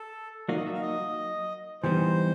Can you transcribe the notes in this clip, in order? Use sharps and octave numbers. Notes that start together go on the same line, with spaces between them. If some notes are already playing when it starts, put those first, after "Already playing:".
Already playing: A4
F#3 A#3 D#4 F#4 D5
D#5
E5
F5
D#5
E3 G3 B3 D#4 C5